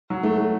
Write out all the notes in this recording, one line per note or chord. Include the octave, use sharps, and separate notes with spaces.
F#3
A3
A3